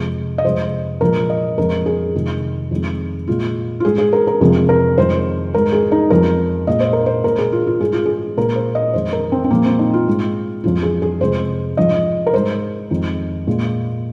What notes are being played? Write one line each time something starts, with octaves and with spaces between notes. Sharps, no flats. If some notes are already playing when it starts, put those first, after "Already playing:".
Already playing: F2 C3 G#3
D#5
F2 C3 G#3 C5
A#2 F3 G#3 A#4
D#5
F2 F3 G#3 A#4
G#4
F2 C3 D#3 G#3
F2 D#3 G#3
A#2 G#3 F4
F4
G#2 G#3 G#4
G#4
A#4
A#4
F2 C3 F3 G#3 G#4
A#4
F2 D#3 G#3 C5
G#2 G#3 A#4
G#4
D#4
F2 F3 G#3 A#4
A#2 G#3 D#5
C5
A#4
C5
A#2 G#3 A#4
G#4
F4
F4
G#2 G#3 G#4
F4
G#4
A#2 G#3 A#4
C5
D#5
F2 D#3 G#3 C5
A#4
C4
C4
A#2 F3 G#3 A#3
C4
D#4
F4
G#2 G#3
F2 F3 G#3 F4
G#4
G#4
F2 C3 G#3 C5
G#2 F3 G#3 D#5
A#4
G#2 G#3 C5
F2 D#3 G#3
A#2 G#3